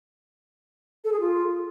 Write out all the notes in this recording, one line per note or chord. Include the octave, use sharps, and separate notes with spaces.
A4
G#4
F4